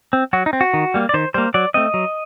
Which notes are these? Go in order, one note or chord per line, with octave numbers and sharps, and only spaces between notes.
C4
F#3 F#4
D#4
C4
F#4
D#3
G3 A#3
D5
D#3 C5
G3 A#3 C5
F#3 D5
A3 C4 D#5
F#3